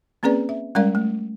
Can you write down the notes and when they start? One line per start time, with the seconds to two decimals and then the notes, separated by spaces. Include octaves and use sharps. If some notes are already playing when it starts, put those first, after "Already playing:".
0.23 A#3 C4 C#4 G#4 B4 D5
0.49 E5
0.75 G3 G#3 C#4 A#4 D5 F5
0.95 A3